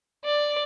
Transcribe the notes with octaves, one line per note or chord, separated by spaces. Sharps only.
D5